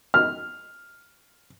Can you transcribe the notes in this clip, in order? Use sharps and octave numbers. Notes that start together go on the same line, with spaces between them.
F6